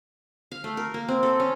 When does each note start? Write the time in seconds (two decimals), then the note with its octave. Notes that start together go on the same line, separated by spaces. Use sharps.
0.52 F5
0.64 A3
0.77 A#4
0.94 A#3
1.08 C4
1.23 A4
1.40 C#4